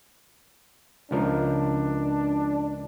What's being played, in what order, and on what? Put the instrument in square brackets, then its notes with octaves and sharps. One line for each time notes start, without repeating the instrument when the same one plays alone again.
[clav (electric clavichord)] C#2 F3 A#4 [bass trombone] D4